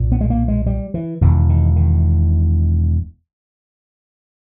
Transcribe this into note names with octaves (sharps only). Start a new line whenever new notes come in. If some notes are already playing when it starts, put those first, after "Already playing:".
Already playing: B1 A#2
B3
G#3
A#3
G#3
G3
E3
E1 E2 B2 D#3
D#3
D#3